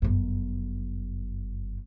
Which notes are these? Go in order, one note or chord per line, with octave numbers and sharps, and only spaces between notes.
G1 F#2